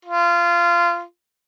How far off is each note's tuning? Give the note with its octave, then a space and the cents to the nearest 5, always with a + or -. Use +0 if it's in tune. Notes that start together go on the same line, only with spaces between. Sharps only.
F4 -20